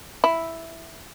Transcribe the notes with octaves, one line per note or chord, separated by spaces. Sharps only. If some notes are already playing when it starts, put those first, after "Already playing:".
E4